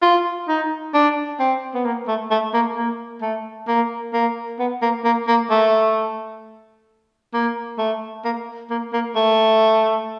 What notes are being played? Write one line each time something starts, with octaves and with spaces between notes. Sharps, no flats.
F4
D#4
D4
C4
B3
A#3
A3
A3
A#3
A#3
A3
A#3
A#3
B3
A#3
A#3
A#3
A3
A#3
A3
A#3
A#3
A#3
A3